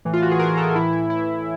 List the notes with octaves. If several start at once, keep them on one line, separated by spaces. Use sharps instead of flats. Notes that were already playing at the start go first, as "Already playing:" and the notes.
A2 E3
F4
F#4
G#4
A#4
A4
A2 E3 E4
E4
E4